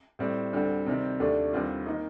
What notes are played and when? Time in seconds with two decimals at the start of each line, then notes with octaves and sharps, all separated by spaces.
0.19 A2 G3 C4
0.53 D2 D3 G3 C4
0.86 C3 D#3 G3 C4
1.20 D#2 D3 A3 D4 G4
1.53 D#2 D3 G3 C4 F4
1.86 D#3 A#3 D#4